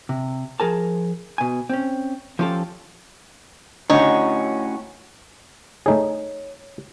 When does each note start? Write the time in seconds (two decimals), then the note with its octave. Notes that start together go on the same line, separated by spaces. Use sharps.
0.09 C3
0.60 F3 G#4 A#4 A5
1.38 B2 G#5
1.69 C4 C#4
2.39 F3 C#4 F4 G4 A4
3.90 A2 D3 C#4 D#4 F#4 C#5
5.86 A3 D#4 G#4 C#5